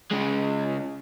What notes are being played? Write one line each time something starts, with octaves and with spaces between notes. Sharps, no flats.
C#3 G#3